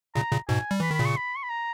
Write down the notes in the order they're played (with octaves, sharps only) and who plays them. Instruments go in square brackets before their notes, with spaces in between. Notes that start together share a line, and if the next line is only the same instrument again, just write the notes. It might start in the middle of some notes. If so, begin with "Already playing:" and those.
[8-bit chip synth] A#2 C#3 [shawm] A#5
[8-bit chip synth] A#2 C#3
[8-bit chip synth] G#2 B2 [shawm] G#5
[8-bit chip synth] G3
[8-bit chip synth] E3 [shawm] B5
[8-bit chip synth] D#3 [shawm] B5
[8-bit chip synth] A#2 C#3
[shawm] C#6
B5
C#6
B5
A#5